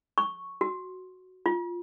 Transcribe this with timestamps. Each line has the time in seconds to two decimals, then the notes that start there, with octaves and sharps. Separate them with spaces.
0.18 C#6
0.61 F#4
1.46 F4